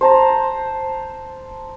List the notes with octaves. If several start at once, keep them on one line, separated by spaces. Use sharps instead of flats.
C5 A5 A#5